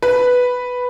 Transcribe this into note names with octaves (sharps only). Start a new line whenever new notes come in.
B4